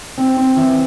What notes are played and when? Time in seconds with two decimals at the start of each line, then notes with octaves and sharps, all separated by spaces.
0.18 C4
0.37 C4
0.56 E3